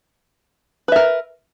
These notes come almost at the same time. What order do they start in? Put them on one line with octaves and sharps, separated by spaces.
B4 E5 A#4